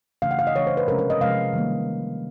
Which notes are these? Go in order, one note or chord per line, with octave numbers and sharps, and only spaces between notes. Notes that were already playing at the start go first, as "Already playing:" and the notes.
C#3 E3 A3 D4 F5
F#5
F5
D#5
C#3 E3 A3 D4 C#5
C5
B4
C3 F3 G#3 C#4 A#4
A#4
D#5
C3 F3 G#3 C#4 F5
D#3 G3 A#3